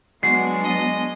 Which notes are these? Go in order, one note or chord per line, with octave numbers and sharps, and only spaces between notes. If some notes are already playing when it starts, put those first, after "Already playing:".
F#3 G#3 B3 D4 F#4 C7
D#5